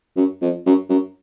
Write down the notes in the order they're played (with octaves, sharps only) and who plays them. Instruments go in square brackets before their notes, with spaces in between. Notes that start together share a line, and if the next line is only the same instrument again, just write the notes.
[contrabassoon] F#2
F2
F#2
F#2